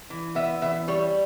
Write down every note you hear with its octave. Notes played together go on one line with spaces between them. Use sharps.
E3
B3 E5
E3 E5
G3 C#5